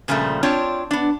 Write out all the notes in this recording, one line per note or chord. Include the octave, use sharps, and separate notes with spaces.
A#2 C#3 F3 G3 A3
C4 D4 F4 C#5
B3 D4